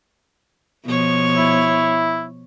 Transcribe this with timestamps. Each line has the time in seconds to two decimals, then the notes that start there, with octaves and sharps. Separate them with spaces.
0.85 B2 F3 C#5
1.37 E4